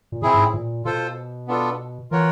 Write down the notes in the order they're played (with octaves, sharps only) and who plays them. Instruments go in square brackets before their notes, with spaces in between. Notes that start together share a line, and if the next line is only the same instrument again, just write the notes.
[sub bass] A#2
[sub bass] B2 [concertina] C4 E4 G#4
[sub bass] G#2
A2
A#2
[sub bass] B2 [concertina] F4 A4 C5
[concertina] B3 D4 F4 A4
[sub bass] E3 [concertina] F4 A#4 C#5 F#5